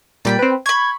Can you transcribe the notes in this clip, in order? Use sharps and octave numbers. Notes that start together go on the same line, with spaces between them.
A#2 G3 D5 G5 B5
C4 B4
B5 C#6 G#6